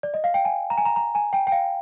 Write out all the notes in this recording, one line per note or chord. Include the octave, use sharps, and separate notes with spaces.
D5
D#5
F5
G5
G#5
A#5
G#5
A#5
A#5
G#5
G5
G5
F5